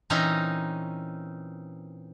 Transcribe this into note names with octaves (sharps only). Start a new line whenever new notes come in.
A#2 E3 C4 C#4 D#4 A#5